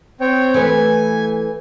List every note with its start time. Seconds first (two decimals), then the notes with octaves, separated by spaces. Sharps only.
0.21 C4 C#5 G5
0.54 E3 A3 B4 G#5